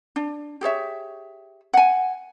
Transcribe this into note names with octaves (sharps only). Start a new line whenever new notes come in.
D4
G4 G#4 C#5 E5
F#5 G#5